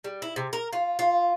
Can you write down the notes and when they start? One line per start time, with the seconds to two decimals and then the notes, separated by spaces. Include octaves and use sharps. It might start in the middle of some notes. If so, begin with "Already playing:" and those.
0.04 G3
0.22 E4
0.36 C3
0.53 A#4
0.73 F4
0.99 F4